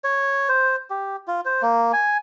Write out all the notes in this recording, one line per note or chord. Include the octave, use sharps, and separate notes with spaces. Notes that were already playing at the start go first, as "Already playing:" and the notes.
C#5
C5
G4
F4
C5
A#3
G#5